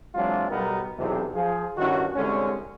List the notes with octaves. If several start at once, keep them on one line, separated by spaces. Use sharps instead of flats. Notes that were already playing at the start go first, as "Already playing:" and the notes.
E3 F#3 G#3 C4 D4 F4
B1 B2 G3 B3 D#4 A#4
B1 E2 C3
F3 G#4
G2 D#3 C#4 E4 F#4
C2 D3 G#3 C#4